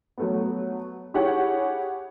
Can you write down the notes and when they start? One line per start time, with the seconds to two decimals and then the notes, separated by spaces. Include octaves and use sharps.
0.18 F#3 A3 B3
1.14 E4 G4 G#4 C#5 F#5